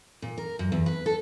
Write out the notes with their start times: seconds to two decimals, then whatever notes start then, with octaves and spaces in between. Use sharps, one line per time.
0.22 A#2
0.38 A#4
0.59 F#2
0.72 E2
0.86 B4
1.06 A4